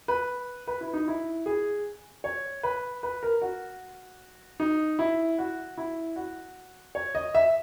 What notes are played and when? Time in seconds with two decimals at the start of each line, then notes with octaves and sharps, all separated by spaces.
0.08 B4
0.68 B4
0.81 E4
0.93 D#4
1.08 E4
1.46 G#4
2.24 C#5
2.63 B4
3.03 B4
3.23 A#4
3.42 F#4
4.60 D#4
4.99 E4
5.38 F#4
5.78 E4
6.16 F#4
6.95 C#5
7.15 D#5
7.35 E5